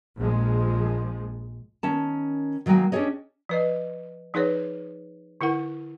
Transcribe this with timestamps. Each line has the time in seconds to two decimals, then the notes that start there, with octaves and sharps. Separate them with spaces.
0.18 A#1 F3 G#3
1.83 D#3 C#4 A5
2.66 D#3 F#3 G#3 A#3 G5 G#5
2.92 C#4 D4 G4 G#4 C#5 D#5
3.49 F3 B4 D#5
4.34 F3 D#4 G#4 B4 C#5
5.41 D3 E4 A#4 F#5